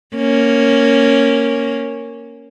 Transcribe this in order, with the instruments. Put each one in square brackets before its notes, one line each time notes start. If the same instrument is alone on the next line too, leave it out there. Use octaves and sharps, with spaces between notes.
[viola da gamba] A#3 C#4